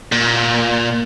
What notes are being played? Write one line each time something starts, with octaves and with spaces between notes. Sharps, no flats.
A#2